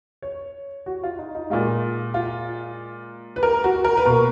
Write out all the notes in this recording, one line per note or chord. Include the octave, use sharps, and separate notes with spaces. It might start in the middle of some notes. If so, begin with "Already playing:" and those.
C#5
F#4
F4
D#4
D#4
A#2 G#3 F4
F4
B4
A#4
F#4
A#4
B4
B2 A#3 A#4